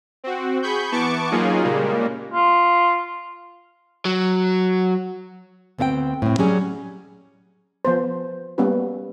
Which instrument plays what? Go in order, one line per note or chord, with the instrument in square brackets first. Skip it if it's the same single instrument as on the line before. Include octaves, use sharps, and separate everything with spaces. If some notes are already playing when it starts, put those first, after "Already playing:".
[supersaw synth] C4 F#4
G#4 B5 C#6 G6
E3 B3 A5 C#6 D6 C#7
F#3 A#3 C#4 D#4 F4 G#4
A#2 C#3 G3 G#3 A#3
[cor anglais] F4
[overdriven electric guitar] F#3
[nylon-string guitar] D2 B3 C4 F5 G5
A2 C4
F#3 G3 C#4 G#4
[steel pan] F3 B3 C5
G3 A#3 B3 C#4 F#4 B4